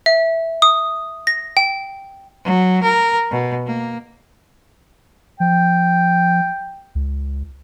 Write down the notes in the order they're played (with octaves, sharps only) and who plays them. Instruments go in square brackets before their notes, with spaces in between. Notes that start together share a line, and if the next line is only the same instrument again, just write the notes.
[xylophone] E5
D#6
A#6
G5
[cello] F#3
A#4
B2
A#3
[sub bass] F3 [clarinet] G5
[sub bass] C#2